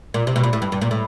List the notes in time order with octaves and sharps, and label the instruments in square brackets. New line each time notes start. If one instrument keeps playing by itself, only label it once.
[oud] A#2
C3
B2
A#2
A2
G2
G2
A#2
A2